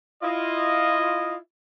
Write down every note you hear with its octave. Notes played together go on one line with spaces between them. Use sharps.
E4 F4 D#5